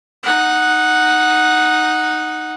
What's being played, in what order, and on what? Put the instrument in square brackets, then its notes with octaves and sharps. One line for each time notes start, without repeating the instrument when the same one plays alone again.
[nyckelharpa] D#4 F#5